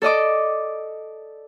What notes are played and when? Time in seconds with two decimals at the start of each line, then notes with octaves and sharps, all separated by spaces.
0.02 A4 D5 D#5 D6